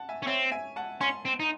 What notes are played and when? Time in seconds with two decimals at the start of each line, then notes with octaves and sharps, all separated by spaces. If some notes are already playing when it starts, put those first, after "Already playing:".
Already playing: F#5 A5
0.09 E5 G#5
0.22 C#4
0.27 C4 C#5 E5
0.51 E5 G#5
0.76 F#5 A5
1.01 C#4 G#5 C6
1.25 C4
1.40 D#4